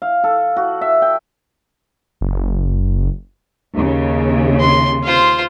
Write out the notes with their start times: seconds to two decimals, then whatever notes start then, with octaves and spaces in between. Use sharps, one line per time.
0.02 F5
0.24 A4
0.57 F#4
0.81 E5
1.02 G5
2.21 F#1
3.74 D#2 C#3
4.60 C6
5.04 F4 C5